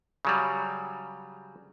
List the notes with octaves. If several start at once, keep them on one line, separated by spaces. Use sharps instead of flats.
C#3 F#3 G3